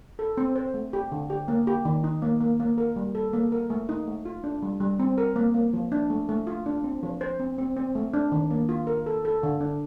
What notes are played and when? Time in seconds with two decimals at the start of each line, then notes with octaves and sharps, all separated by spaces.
0.19 A4
0.37 C4
0.56 C5
0.74 A3
0.93 G4
1.12 D3
1.30 G4
1.48 A#3
1.67 G4
1.85 D#3
2.04 D#4
2.22 A#3
2.41 A#3
2.60 A#3
2.78 A#4
2.96 G3
3.15 A4
3.33 A#3
3.52 A#4
3.70 A3
3.89 D#4
4.07 A3
4.25 F4
4.44 D4
4.62 G3
4.80 G3
4.99 C4
5.18 A#4
5.36 A#3
5.54 A#3
5.73 F3
5.92 D4
6.10 A3
6.29 A3
6.47 F4
6.66 D4
6.84 C4
7.03 F3
7.21 C5
7.39 C4
7.58 C4
7.77 C4
7.95 A3
8.14 D4
8.32 D#3
8.51 A#3
8.69 F4
8.87 A#4
9.06 A4
9.25 A4
9.43 D3
9.61 D4